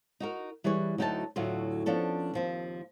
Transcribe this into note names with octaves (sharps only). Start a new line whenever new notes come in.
D#4 F#4 A#4
E3 G3 G#4 B4 C#5
D2 F#3 D#4 E4 G5 A5
D2 A2 F#3 F4
F3 B3 C#4 D4 A4
D#2 F3 C4